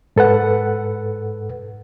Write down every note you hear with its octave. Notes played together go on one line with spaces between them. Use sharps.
G#2 A4 B4 F#5